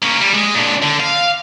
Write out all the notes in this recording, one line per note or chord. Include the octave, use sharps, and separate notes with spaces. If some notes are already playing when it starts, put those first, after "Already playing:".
A#3 C#4
G3
G#3
A#2 D3
D3
F5